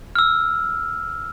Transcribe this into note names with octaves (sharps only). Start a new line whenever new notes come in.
E6 F6